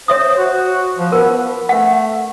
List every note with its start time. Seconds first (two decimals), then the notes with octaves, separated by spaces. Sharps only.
0.08 C5 C#5 E5 D#6
0.38 F#4
0.99 F3
1.12 B3 A#4
1.69 A3 F#5